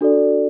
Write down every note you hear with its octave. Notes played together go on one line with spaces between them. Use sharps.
D4 F#4 A4 D5